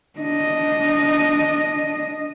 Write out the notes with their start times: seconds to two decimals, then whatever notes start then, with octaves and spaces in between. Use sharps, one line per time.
0.19 D4 D#5